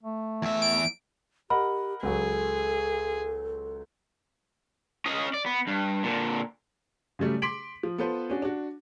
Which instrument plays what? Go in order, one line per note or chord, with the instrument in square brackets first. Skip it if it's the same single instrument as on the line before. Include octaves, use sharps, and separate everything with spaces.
[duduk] A3
[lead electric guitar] E2 E5
[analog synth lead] D7
[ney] G4 [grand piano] A#4 D#5 F#5 [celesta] B5
[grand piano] C#2 F#3 [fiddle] G#4 [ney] A4
[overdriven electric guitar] C#4 D#5
D5
B3
G2
A#2 D3
[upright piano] C#3 F#3 G3 A3
C6 D6 B6 D7 F#7
F3
B3 F4 A4 B4 C5
C#4 D4 F#4
D4 F#4